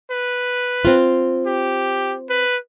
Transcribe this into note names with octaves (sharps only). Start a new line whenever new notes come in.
B4
C4 F4
G4
B4